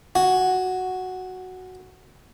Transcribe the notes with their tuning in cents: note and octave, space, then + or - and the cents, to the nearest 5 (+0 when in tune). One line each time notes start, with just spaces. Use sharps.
F#4 +0 G#5 +5